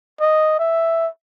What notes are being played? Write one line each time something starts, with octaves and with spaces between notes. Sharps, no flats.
D#5
E5